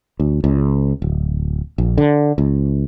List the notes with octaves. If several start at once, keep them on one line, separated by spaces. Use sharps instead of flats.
D2
C#2
D1
A#1
D3
C#2